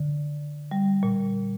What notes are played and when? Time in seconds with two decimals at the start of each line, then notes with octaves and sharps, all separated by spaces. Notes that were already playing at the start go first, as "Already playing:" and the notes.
Already playing: D3
0.71 G3
1.03 A#2